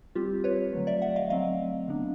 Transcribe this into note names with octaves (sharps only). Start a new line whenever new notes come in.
G3 C4 F4 G4
B4 C#5
D3 F#3 A3
D5 E5
E5 F#5
D#5 F5
F#3 A3 C4 D#5 F5
D3 F#3 B3 D4